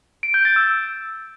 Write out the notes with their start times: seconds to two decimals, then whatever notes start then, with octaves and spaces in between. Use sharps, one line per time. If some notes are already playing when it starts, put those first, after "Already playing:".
0.23 D7
0.34 G6
0.45 A6
0.56 E6